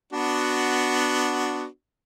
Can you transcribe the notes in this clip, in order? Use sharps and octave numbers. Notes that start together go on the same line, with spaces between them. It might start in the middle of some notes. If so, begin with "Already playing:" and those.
B3 D4 F#4